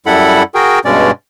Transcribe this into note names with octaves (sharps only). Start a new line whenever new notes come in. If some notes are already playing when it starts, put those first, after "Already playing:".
F#2 G3 E4 A4 F#5 B5
F#4 G#4 A#4 G5
G2 B2 G#3 C#4 D5